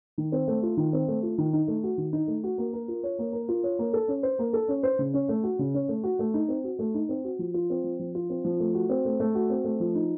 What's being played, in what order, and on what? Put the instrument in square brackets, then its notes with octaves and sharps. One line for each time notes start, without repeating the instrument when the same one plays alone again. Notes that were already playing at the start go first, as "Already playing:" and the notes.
[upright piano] D#3
C4
A3
F4
D#3
C4
A3
F4
D#3
D#4
A3
F#4
D#3
D#4
A3
F#4
A#3
A#4
F4
C#5
A#3
A#4
F4
C#5
A#3
A4
C#4
C5
A#3
A4
C#4
C5
C#3
C#4
A3
F#4
C#3
C#4
A3
F#4
A3
D#4
C4
F#4
A3
D#4
C4
F#4
F3
F4
C4
F3
F3
F4
C4
F3
A3
F#4
C4
A3
A3
F#4
C4
A3
F3
D#4